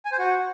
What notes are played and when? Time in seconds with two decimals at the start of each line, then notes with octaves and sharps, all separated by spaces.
0.05 G#5
0.12 C5
0.19 F#4